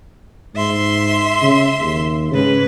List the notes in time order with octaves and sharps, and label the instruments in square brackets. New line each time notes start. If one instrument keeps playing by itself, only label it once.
[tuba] G#2 [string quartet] E5 C6
[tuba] C#3
D#2
[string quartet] G#2 B4 [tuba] C#3